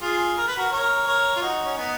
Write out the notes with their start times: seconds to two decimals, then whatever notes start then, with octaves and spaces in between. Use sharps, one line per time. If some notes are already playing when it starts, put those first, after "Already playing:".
0.01 F4 G#4
0.38 A#4
0.48 B4
0.58 F#4 A#4
0.71 A#4 C#5
1.07 A#4 C#5
1.36 F4
1.42 D#4 F#4
1.65 C#4
1.77 B3 D#4